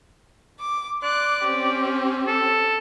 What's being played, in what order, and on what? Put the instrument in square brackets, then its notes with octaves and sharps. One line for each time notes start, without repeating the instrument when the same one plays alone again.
[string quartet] D6
[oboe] D5 [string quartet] C6 D6 F#6
[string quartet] C4 C#4 G4
[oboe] A4